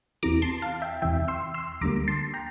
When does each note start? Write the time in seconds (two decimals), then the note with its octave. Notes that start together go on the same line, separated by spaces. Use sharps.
0.23 E2 C3 E3 A#5 D6
0.42 A5 C6
0.62 F5 A5
0.82 E5 G5
1.02 E2 C3 E3 E5 G5
1.28 C6 E6
1.54 C6 E6
1.81 D2 D3 G3 A#3 A#5 D6
2.08 A5 C6
2.34 G5 A#5